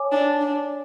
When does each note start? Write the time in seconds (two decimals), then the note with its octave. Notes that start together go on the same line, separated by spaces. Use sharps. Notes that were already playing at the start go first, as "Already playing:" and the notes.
Already playing: C#5 G#5 D6
0.12 D4
0.41 D4